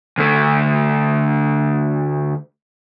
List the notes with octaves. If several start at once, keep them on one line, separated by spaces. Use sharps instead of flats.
D2 A3